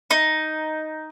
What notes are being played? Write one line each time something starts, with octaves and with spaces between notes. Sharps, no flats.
D#4